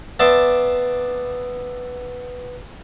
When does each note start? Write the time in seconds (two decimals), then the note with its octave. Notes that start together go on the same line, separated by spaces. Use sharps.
0.20 B3 D5 E5 A5 C6 D6